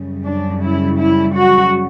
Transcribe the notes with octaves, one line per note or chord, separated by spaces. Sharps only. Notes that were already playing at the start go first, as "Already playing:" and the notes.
Already playing: F#2 C#3 G3
D4
E4
E4
F#4